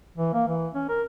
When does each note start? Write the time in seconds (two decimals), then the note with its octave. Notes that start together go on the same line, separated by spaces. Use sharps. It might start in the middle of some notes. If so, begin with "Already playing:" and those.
0.18 E3
0.34 A#3
0.47 E3
0.75 C#4
0.89 A#4